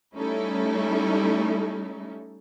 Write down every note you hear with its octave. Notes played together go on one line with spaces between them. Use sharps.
G3 A3 C#4 D#4 E4 A4